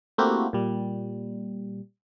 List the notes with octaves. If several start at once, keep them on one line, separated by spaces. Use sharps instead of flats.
A3 A#3 C4 E4 F#4 G4
A#2 G3